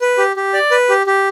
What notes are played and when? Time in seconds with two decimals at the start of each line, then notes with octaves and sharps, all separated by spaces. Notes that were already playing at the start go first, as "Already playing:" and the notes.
0.01 B4
0.18 G4
0.36 G4
0.54 D5
0.71 B4
0.89 G4
1.07 G4